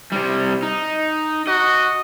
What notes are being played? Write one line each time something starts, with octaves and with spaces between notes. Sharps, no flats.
C3 G3
D#4
F#4 D#5